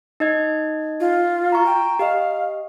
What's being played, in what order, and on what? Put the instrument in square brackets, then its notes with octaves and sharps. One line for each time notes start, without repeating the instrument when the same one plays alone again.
[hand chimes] D#4 D#5 G#6
[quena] F4
[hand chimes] A#5 C#6
[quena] G5
[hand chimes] G4 D#5 [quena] F5